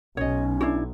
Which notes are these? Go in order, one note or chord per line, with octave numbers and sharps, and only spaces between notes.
B1 C#4 C#5 D#5
D4 E4 F#4